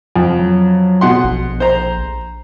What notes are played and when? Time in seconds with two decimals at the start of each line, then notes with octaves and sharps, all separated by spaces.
0.16 F2
0.39 F#3
1.01 B2 F#5 C6
1.24 A#1
1.60 C5 A#5